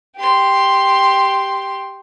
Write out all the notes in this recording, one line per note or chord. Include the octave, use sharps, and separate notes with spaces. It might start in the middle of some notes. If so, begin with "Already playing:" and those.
G4 C6